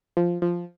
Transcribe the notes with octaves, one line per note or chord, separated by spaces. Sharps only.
F3
F3